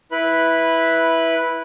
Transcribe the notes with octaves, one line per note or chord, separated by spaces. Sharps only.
E4 B4 B5